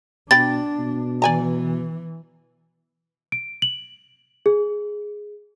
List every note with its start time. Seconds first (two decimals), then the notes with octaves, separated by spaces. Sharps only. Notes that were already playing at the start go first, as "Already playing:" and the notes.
0.31 B2 D4 D5 G5 B5 A6
0.79 B2
1.22 E3 D5 G#5 A#5
3.32 D7
3.62 F#7
4.46 G#4